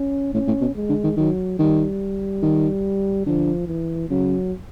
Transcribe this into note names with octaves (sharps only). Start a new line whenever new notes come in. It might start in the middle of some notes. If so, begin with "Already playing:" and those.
Already playing: C#4
A2 C#4
A2
B2
G#3
D3
D#3
D#3 F#3
D#3 G3
D#3
D3 F3
E3
C#3 F#3